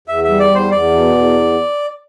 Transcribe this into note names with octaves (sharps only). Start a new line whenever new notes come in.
E2 E5
G3 E5
D5
E2 C5
E2 D5
B2
E2